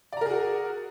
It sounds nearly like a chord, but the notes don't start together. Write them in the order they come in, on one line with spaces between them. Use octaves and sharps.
D5 A#5 A#4 G#4 F#4